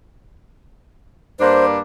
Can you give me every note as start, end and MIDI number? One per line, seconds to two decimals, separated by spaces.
1.40 1.79 43
1.40 1.79 58
1.40 1.79 62
1.40 1.65 72